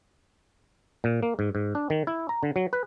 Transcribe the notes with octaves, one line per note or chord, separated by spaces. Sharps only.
A#2
A#3
G#2
G#2
D4
D#3
E4
A#5
D3
F#3
B4